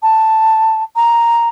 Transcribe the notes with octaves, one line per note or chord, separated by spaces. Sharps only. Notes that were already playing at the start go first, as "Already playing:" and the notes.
A5
A#5